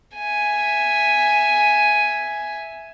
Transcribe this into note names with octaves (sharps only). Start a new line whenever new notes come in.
E5 G#5